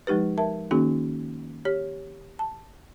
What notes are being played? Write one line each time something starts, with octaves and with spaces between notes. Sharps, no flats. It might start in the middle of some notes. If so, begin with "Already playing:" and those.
F3 G#3 D#4 G4 B4
A#4 E5 A5
D#3 A#3 C#4 D#4 F#4 G#4
G4 C#5
A5